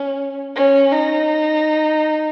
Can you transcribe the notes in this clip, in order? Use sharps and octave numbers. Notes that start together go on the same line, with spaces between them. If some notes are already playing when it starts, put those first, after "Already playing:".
Already playing: C#4
C#4
D#4